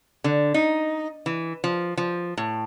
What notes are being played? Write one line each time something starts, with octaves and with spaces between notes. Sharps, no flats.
D3
D#4
E3
F3
F3
A2